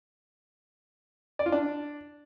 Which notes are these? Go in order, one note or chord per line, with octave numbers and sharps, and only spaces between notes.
D5
F4
D4